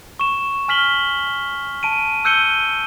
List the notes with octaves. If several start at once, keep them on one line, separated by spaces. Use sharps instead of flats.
C#6 E7
G#5 F6 B6 F#7 G7
A5 D7 D#7
E6 F#6 G6 C#7 D#7 G7